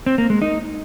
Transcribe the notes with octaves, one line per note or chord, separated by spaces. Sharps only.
C4
A#3
G#3
D#4